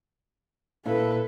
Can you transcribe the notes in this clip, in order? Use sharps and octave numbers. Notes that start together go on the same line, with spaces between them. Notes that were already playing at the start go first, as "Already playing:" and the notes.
A#2 E4 A4 B4 F5